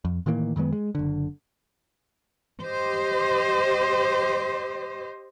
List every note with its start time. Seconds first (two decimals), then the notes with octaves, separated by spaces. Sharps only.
0.05 F2
0.26 A2 D#3 E3 A#3
0.56 F#2 D#3 G#3 B3
0.73 G#3
0.95 F#1 D3
2.62 G4 C5 D#5